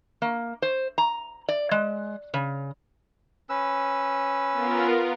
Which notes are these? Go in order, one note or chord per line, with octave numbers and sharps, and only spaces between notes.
A#3
C5
A#5
D5
G#3
C#3
C#4 B4 E6
B3 F4 A#4